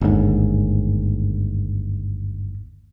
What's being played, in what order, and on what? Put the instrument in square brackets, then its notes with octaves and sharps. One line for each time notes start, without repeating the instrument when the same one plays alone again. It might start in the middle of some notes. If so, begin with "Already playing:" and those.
[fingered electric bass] G1 D#2 G#2